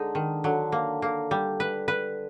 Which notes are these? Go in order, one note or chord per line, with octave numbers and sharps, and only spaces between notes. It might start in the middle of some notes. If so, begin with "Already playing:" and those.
Already playing: D3 G#3 D#4
D#3
D3 F#3
A#3
A#3
G3
B4
B4